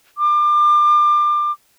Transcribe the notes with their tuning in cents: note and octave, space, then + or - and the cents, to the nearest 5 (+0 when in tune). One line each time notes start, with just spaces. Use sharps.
D6 +30